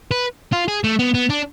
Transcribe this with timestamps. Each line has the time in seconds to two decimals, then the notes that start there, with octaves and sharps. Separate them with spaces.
0.11 B4
0.53 F4
0.68 G#4
0.84 A3
0.99 B3
1.14 B3
1.30 D4